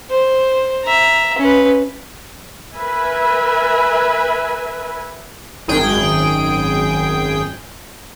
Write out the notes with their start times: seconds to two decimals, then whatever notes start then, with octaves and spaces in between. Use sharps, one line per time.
0.10 C5
0.84 E5 A#5
1.38 C#4 B4
2.76 A#4 B4 E5 G#5 B5
5.68 G#1 F#2 G#4 G5